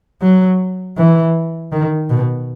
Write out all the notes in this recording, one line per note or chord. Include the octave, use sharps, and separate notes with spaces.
F#3
E3
D#3
B2